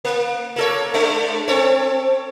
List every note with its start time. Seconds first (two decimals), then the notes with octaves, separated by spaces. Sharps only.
0.05 A#3
0.56 A#3 A4 C#5
0.94 G#3 A3 D4
1.48 C4 A4 C#5